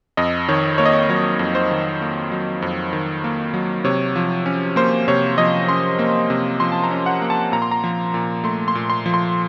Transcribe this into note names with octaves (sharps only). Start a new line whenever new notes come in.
F2 D#5
D#3 C#5
A#3 C#5
D#5
C#5
F#3 C#5
F2
C5
D#3
A#3
F#3
F2
D#3
A#3
F#3
C3 C#5
F3
C#4
A#3 C5
C3 C#5
F3 D#5
C#4 C6
A#3
C3
F3 C6
A5
A#5
C#4
F#5
A#3
A5
A#2 A#5
C6
A#5
F3
A#2
A3 C6
C6
A#2
C6
F3
C6